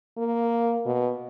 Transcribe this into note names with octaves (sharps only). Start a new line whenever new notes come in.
A#3
B2